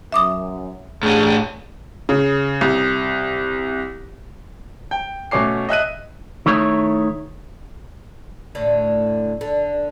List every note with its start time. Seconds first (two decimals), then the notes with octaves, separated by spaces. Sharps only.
0.12 F#2 E5 D6 D#6
1.03 A2 C#4 D4 G#4
2.09 C#3
2.61 C2
4.91 G5
5.31 B2 A3 C#4 D6 C7
5.69 D#5 E5 F#6 D#7
6.46 D#3 A3 E4 C#5
8.55 A2 D3 A3
9.41 D3